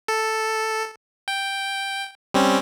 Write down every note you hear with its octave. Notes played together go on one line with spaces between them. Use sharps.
A4
G5
G3 C4 C#4